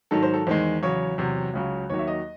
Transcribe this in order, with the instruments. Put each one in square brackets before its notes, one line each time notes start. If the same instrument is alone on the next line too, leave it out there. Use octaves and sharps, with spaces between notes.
[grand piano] G#2 D#3 F#3 A4
C5
A4
E2 D#3 G#3 C5
E2 C#3 F#3 C#5
E2 C3 F#3
C#2 C#3 F#3
D#2 D#3 F#3 C#5
E5
D#5